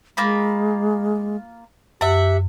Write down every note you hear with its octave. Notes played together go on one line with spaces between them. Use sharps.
G#3 A#3 F4 B5
F#2 G4 E5 F#5